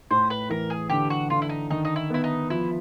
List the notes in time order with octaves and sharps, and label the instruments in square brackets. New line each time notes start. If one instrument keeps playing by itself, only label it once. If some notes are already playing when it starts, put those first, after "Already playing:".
[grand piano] A2 [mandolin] C5
[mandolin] B4
[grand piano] E3 [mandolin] A#4
[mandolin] G#4
[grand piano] D3 [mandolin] G4
[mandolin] F#4
[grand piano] D3 [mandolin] F4
[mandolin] E4
D#4
[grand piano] D#3 [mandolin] D#4
[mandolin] D#4
E4
[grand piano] B3 [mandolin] E4
[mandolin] D#4
[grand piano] F3 [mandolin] E4